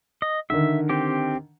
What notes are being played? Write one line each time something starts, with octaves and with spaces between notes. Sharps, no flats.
D#5
D3 D#3 E5
C4 G4